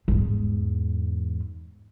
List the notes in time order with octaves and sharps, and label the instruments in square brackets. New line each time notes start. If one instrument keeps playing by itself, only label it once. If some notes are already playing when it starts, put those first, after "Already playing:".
[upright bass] E2 G#2